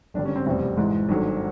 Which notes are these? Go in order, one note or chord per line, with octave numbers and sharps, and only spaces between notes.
G#1 G2 D3 G3 D4
C#4
C4
F1 E2 B2 G3 C4
G#1 G#2 E3 G#3
G#1 G2 D#3 F#3 A3